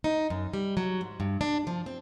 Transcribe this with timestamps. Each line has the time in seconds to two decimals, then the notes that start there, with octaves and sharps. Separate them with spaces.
0.04 D#4
0.30 F#2
0.54 G3
0.77 F#3
1.01 G#2
1.20 G2
1.41 D4
1.67 F3
1.86 C4